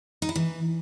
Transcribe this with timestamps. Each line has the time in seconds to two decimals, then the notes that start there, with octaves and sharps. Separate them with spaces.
0.22 D#4
0.29 E4
0.36 E3